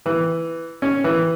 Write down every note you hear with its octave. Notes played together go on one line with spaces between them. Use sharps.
E3
C#4
E3